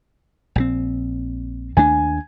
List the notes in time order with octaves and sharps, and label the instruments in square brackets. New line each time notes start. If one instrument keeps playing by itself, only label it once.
[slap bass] A#1 C#3 C4
[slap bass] D#2 A3 D4 [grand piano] G#5